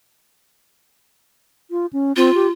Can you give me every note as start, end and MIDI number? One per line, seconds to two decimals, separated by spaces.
1.71 1.86 65
1.93 2.13 61
2.16 2.33 60
2.16 2.51 65
2.35 2.47 67